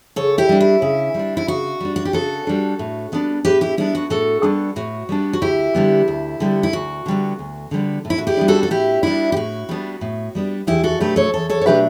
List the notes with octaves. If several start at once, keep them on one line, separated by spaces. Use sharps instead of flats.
C#3 A4 C#5
E4 G4
G3 D4
E4
C#3
G3 D4
E4
C#3 F#4
G3 D4
F#4
G4
C#3 F#4 A4
G3 D4
A2
G3 B3 D4
A2 G4 B4
E4 G4
G3 B3 D4 E4
F#4
A2 F#4 A4
G3 B3 D4
A2 F#4
G3 B3 D4
F#4
D2 E4 G4
D3 G3 B3
D2
D3 G3 B3
E4
D2 F#4
D3 G3 B3
D2
D3 G3 B3
A2
E4
F#4
E4 G4
G3 B3 D4
F#4 A4
A4
A2 E4 G4
G3 B3 D4 E4
G4
A2 F#4
G3 B3 D4
A2
G3 B3 D4
E2 E4 G4
F#4 A4
B2 F#3 A3 D4 G4 B4
A4 C#5
E2 A4 C#5
A4 C#5
C#5
B2 F#3 A3 D4 G4 B4